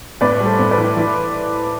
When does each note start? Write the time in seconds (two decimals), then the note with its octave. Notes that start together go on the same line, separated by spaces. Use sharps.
0.21 A2 B4 D5
0.40 G3
0.46 A4 C5
0.58 A2
0.71 B4 D5
0.78 E3
0.97 E3